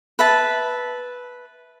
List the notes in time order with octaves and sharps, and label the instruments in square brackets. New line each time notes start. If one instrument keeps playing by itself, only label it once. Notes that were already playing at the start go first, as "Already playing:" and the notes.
[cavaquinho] B4 E5 A5